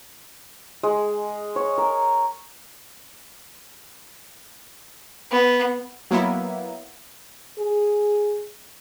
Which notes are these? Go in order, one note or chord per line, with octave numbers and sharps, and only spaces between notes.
G#3
C#5
A#4
B3
F#3 A#3 B3 E4
G#4